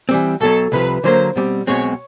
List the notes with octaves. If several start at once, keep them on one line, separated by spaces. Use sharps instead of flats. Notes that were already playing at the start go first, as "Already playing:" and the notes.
E3 G3 C4
B1 B2 F#3 A4
C2 C3 F3 B4
D3 F#3 A#3 C5
B2 G3 C4
B1 B2 G#3 C4 C#5